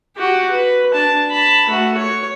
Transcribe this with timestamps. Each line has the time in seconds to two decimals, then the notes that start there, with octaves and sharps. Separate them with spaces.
0.16 F#4 G4
0.51 B4
0.93 D4 A5
1.31 A5 B5
1.69 A3 F#4
1.97 C#5